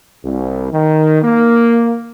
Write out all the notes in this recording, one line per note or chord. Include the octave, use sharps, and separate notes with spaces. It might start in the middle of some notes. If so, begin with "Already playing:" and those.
C2
D#3
A#3